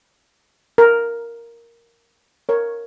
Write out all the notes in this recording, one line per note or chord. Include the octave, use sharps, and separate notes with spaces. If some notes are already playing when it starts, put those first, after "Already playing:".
A#4
A#4 C#5